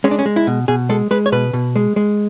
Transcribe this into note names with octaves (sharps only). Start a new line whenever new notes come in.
G#3 C#4
D4
C#4
G#3
E4
B2
B2 G#4
G#3 A4
G#3 B4
C#5
B2 B4
B2
G#3
G#3